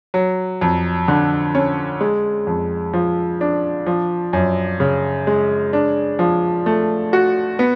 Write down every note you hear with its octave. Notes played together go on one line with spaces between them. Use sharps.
F#3
F2
D3
C#4
G#3
F2
F3
D4
F3
F#2
C#3
G#3
D4
F3
A3
F#4
B3